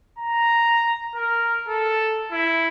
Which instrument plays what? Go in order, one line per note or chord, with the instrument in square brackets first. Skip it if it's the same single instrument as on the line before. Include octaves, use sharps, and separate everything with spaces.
[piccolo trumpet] A#5
A#4
A4
E4